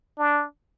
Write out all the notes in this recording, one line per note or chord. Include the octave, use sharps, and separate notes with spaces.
D4